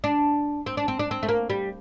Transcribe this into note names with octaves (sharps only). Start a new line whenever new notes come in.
D4
C4
D4
C4
D4
C4
A3
A#3
G3